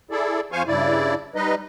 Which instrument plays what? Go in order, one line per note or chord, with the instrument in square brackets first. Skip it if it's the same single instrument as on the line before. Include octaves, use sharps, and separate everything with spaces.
[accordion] E4 G#4 A4 D5
F2 F3 C5 F5 G#5 C#6
G2 C#3 E4 D5
G3 D#4 B4 D#5